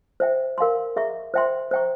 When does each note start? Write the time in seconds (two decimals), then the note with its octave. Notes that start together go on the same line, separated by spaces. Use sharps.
0.20 C5 E5 G5
0.58 A#4 F5 G#5 C6
0.96 G#4 E5 A#5 C#6
1.34 C5 E5 G5 C6
1.71 C5 E5 G5 A#5 C#6